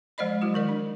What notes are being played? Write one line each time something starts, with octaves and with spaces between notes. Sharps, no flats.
F3 G#3 C5 D5 D#5 B5
F#3 G#3 E4 F#4
D#3 A#4 D5
D4